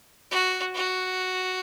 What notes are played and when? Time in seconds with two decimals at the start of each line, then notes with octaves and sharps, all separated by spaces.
0.31 F#4
0.75 F#4